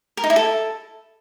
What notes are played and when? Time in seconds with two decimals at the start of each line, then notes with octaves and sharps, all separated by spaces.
0.17 A#4
0.24 D#4
0.30 E4
0.36 A4